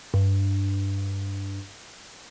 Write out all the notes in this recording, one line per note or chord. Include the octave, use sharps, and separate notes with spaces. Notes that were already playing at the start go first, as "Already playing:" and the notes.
G2